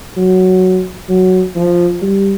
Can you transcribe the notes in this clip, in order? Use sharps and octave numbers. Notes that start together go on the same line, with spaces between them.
F#3
F#3
F3
G3